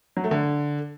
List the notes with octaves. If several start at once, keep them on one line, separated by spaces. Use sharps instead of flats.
F#3
A3
D3